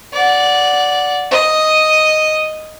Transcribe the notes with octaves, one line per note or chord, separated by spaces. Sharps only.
D5 F#5
D#5